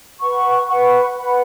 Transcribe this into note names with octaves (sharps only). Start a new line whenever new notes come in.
B4 F#5 C#6
B4 F#5 C#6
B4 F#5 B5